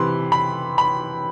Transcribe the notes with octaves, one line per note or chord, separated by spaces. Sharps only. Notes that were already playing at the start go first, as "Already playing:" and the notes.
Already playing: C3 E3 B5 C6
B5
B5